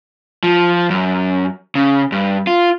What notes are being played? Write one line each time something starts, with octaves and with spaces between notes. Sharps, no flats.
F3
F#2
C#3
G2
F4